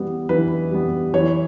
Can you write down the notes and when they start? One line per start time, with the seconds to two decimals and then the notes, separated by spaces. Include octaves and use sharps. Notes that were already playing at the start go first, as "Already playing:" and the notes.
Already playing: E3 G3 B3
0.29 E3 B4
0.71 G3 B3
1.13 E3 C#5